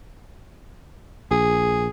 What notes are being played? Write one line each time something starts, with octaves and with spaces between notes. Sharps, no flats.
A#1 G#4